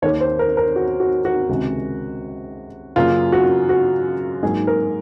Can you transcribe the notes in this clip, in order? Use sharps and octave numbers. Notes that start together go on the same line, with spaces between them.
D#2 D#3 A#3 C#5
C5
A#4
A#4
F#4
F#4
F#4
C#2 C3 D#3 G#3
F#2 C#3 F#3 A#3 F4
F#4
F#4
G#2 F#3 A#3 G#4
A#4